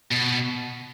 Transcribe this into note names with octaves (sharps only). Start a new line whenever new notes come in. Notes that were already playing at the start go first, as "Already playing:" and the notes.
B2